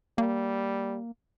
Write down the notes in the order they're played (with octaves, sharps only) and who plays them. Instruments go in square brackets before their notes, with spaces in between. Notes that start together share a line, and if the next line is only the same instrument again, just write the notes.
[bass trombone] G3 [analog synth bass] A#3